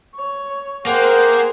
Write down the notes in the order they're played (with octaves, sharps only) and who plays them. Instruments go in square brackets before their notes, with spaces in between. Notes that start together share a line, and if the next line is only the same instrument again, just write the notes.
[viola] C#5
[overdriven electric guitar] A#3 [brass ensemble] G#4 C5 [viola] A#4 G5 [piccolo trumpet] F#5